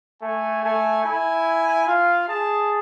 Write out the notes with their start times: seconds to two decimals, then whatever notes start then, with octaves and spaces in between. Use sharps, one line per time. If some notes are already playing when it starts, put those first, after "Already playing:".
0.22 A3 G#5
0.63 A3 G#5
1.04 E4 G#5
1.87 F4 F5
2.28 G#4 A5